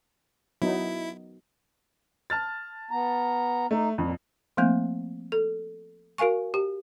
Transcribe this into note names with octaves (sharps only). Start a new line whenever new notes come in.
F#3 B3 D#4 E4
A5 F6 A6
B3 A#5
A3 D#4
F2 A#2
F3 A3 A#3 C4
A4
F#4 A#4 F5 G#5 C#6
G4